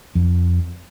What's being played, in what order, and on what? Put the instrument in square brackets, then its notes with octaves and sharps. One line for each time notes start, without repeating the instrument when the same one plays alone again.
[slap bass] F2